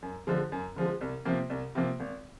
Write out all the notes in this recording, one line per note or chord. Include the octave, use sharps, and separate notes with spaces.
F#2
D3 F3 G#3
F#2
D3 F3 G#3
C2
C3 F3 A#3
C2
C3 F3 A#3
G#1